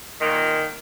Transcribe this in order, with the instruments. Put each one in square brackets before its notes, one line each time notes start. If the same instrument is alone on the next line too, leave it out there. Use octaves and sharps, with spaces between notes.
[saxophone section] A#2 D#3